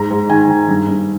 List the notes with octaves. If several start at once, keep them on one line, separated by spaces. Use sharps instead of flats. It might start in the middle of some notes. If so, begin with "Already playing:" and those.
Already playing: G#2 A#5
G#2
D#3 G#5
D#3
G2
G2